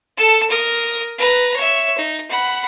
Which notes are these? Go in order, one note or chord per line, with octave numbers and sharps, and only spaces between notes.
A4 A5
A#4 D#6
B4 A#5
C#5 E5
D#4
F#5 B5